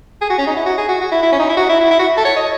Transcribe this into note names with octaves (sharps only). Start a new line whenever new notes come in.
G#4
F#4
C#4
D#4
E4
F#4
G#4
F#4
F#4
E4
E4
C#4
D#4
E4
F#4
E4
E4
E4
F#4
A4
C#5
D#5